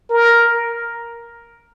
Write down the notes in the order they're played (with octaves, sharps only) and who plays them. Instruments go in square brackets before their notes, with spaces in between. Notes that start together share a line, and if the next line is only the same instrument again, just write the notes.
[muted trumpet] A#4